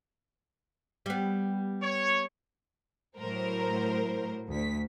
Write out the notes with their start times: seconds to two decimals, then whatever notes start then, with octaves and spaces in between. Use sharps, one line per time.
1.06 G3 B3
1.83 C#5
3.18 A2 F#3 A#4 C5
4.50 D2 B6